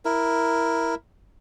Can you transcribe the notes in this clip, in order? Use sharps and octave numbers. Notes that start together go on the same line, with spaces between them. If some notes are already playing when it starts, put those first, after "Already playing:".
E4 A#4